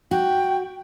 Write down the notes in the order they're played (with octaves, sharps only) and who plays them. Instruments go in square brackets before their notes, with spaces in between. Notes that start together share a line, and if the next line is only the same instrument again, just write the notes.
[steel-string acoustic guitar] F#4 [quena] G5